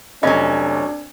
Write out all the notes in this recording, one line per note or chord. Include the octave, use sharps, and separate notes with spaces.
F1 F#3 C#4 D4 D#5